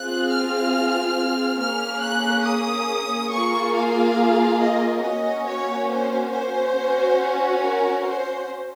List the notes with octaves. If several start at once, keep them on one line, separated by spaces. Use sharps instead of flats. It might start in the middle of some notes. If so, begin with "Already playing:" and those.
Already playing: C4 F4 G#4 F#6
F6
A#3 C#4 G#4 F6
F#6
D#6
A#3 F4 G#4 C#6
F5
D#5
A#3 C#4 F#4 D#5
C#5
C5
C5
C#4 F#4
A#4
C5